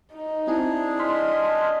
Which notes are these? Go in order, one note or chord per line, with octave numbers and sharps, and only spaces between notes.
D#4
C4 D4 E4 G#4
D#5 C6 F6 B6